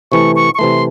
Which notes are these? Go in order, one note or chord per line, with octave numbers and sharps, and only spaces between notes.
C3 E3 A3 C#6
C#6
C#6
C3 E3 A3 C6